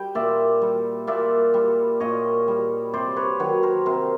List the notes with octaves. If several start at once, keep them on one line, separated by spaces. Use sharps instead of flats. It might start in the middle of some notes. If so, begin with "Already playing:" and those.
Already playing: G3 G5
A#2 D5 E5
G3
A#2 D5 E5
G3
A#2 C#5 D#5
G3
C3 C5 D5
B4 C#5
D#3 F#3 B4 C#5
A#4 C5
C3 A#4 C5